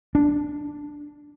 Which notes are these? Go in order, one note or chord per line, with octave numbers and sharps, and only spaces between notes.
D4